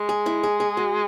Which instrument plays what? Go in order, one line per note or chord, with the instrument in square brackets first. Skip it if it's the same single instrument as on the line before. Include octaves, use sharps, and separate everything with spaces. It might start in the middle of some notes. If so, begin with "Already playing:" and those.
Already playing: [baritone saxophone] G#3
[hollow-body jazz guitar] G#4
E4
G#4
G#4
F#4